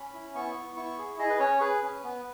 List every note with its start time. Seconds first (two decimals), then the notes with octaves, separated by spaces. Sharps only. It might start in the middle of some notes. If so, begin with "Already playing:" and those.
Already playing: C#4 B5
0.14 E4
0.35 B3 C#6
0.55 B3
0.76 E4 C#6
0.98 G#4
1.19 G#4 D#5
1.30 B4
1.40 C#4 C#5
1.61 G#4 B4
1.83 C#4
2.04 B3